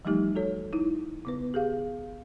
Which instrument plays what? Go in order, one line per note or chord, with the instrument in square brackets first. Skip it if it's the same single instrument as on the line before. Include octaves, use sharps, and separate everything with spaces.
[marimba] E3 F3 G3 A3 D#4 G4
F#4 A4 C#5
D#4 E4
C#3 B3 B4
G4 G#4 F5